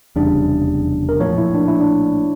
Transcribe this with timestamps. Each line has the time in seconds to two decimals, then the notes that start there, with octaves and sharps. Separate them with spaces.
0.16 F1 E2 C#3 G3 D4
1.09 A#4
1.20 A#1 A2 F3 C#5
1.38 E4
1.55 D4
1.68 E4
1.80 D4